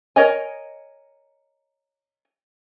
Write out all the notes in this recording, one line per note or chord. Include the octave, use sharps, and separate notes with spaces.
A#4 C#5 D#5 G#5